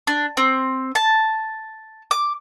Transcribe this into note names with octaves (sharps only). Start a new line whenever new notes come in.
D4
C4
A5
D6